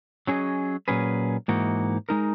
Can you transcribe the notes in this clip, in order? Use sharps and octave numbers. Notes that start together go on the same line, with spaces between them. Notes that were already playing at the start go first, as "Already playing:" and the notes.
F#3 C#4 G#4 D#5
A#2 F#3 C#4 G#4 B4
G#2 E3 A#3 D#4 F#4
G#3 D#4 A#4